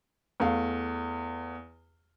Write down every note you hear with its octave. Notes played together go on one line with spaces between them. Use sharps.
E2 A3 F5